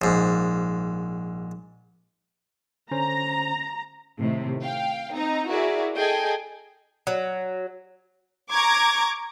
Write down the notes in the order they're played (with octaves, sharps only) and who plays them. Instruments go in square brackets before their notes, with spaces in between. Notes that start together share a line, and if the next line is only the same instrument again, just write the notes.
[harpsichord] A#1 G#2
[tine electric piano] D3 C#4 C5 [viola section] A#5
[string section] A2 C3 D#3
F5 G5
C4 D#4 A#5
E4 F#4 G#4 A#4 D5 E5
G#4 A4 D#5 G5 G#5
[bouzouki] F#3
[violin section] A#5 C#6 D6 G#6